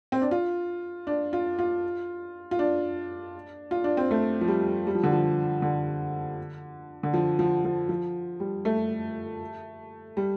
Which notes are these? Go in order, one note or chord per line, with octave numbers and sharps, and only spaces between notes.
C4
D4
F4
D4
F4
F4
F4
D4
F4
D4
C4
A3
F3
G3
G3
F3
D3
F3
D3
D3
F3
F3
F3
F3
G3
A3
G3